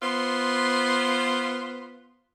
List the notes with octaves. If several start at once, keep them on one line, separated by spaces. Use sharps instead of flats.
B3 F4 C5